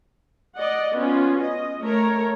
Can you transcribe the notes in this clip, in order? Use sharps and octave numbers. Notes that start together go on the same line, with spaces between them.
D5 D#5 F#5
B3 C#4 F4
D#5
A3 A#4 C#5 A#5